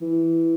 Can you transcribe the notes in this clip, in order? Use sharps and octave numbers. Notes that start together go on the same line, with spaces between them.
E3